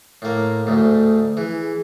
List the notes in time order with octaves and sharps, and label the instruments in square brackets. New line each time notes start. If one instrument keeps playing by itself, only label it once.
[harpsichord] A2 A#3
[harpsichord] D2 G#2 [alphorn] A3
[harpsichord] E3 [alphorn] G#4